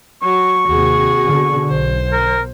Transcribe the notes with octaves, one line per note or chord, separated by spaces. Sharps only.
F#3 C#6
D#2 C3 F#4 G#4
B2 D3
B1 C5
A#4